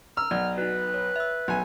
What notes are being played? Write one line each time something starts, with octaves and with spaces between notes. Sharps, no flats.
A#5 E6 F6
B1 D5 F#5 G#6
D#4 F#4 B4
C#5
E5 E6
B1 G#5